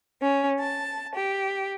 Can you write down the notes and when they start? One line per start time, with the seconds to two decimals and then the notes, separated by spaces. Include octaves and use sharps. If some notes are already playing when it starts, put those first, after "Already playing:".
0.22 C#4
0.59 A5
1.15 G4